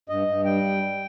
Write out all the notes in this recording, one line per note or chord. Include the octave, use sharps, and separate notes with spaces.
G2 D#5
G2
G3 G5